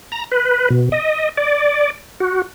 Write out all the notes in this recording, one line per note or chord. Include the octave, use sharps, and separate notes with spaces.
A#5
B4
B2
D#5
D5
F#4